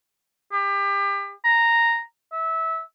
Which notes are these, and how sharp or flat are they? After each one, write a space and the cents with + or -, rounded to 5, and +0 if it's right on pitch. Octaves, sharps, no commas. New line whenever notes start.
G4 +30
A#5 -5
E5 -20